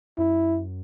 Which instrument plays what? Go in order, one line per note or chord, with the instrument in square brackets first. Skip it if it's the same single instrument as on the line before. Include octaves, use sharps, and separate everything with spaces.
[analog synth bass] F#2 [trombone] E4